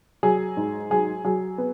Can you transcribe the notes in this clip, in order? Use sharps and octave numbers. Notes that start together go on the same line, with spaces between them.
F#3 G#4
G#2
F#3 G#4
F#3 G#4
B3